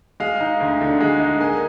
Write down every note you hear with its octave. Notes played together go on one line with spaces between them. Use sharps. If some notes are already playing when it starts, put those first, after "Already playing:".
G#3 F5
D#4
D2
D3
G#3
D#4
A#3 G#5